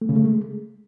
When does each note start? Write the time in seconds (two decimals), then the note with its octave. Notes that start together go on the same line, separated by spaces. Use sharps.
0.01 A3
0.09 C#3
0.17 A3
0.24 G#3